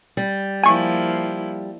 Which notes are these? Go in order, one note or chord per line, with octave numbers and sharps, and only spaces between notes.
G3
F3 A#3 E4 G#5 C#6